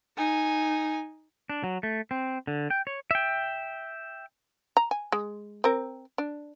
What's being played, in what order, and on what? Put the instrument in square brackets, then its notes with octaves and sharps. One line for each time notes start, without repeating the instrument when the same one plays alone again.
[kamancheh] D#4 G#5
[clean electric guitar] D4
F#3
A3
C4
D3
G5
C#5
[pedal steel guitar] E5 G5
[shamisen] A#5
G#5
G#3
C4 A#4
D4